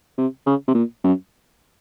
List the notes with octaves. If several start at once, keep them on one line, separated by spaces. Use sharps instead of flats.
C3
C#3
C3
A#2
F#2